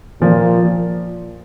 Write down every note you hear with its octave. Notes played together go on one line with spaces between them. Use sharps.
A#2 F3